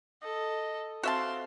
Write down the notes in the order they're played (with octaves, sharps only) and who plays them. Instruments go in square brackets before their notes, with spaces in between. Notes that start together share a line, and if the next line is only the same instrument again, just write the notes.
[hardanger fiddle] A4 [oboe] D#5
[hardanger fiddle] C4 C6 [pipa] F#4 E5 A5 [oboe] F5